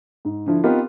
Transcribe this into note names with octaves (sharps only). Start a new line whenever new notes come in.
G#2
D3 F3 E4
B3 C4 D#4 F4 G4 A#4